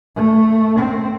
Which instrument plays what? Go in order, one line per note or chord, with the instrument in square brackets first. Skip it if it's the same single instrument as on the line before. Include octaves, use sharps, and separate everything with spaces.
[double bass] A3
C4